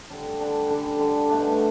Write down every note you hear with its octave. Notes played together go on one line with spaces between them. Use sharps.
D3 G3 D4
D3 G3 D4
D3 G3 D4
D3 G3 D4
B2 A3 D4